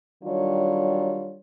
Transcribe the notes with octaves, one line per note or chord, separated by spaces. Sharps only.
D#3 F#3 G3 D4 F4 C#5